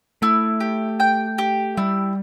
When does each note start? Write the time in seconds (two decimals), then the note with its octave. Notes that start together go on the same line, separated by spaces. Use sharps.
0.22 A3 E4
0.61 G4
1.00 G5
1.38 G4
1.77 G3 E4